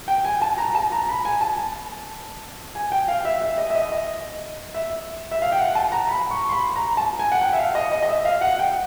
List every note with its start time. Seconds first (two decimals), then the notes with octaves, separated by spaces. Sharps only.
0.08 G5
0.25 G#5
0.42 A5
0.58 A#5
0.75 A5
0.92 A#5
1.09 B5
1.25 G#5
1.41 A5
2.75 G#5
2.92 G5
3.08 F5
3.25 E5
3.41 E5
3.58 D#5
3.70 E5
3.75 D#5
3.92 D#5
4.75 E5
5.31 E5
5.42 F5
5.52 G5
5.58 F#5
5.75 A5
5.92 A#5
6.09 B5
6.31 C#6
6.49 C6
6.52 B5
6.76 A#5
6.97 A5
7.19 G#5
7.32 F#5
7.42 G5
7.53 E5
7.59 F5
7.75 D#5
7.92 D#5
8.03 D#5
8.09 E5
8.25 F5
8.41 F#5
8.59 G5